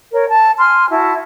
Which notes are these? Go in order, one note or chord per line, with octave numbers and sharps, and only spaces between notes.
A#4 C#5
A5
G#5 C6 F6
E4 F#4 A5